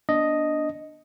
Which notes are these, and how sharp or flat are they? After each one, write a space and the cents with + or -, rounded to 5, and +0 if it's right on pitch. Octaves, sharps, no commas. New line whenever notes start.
B3 -35 D4 +0 D#5 +0